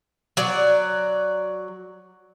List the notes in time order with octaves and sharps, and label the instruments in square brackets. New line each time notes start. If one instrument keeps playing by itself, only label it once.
[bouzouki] F#3 D5